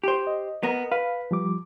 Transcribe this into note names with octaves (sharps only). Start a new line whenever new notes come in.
G4 C5
D#5
B3 A#4
B4 F5
F3 G3 D6